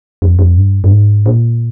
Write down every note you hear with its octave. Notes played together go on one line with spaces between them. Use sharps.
F2
F2
G2
G2
G#2
A#2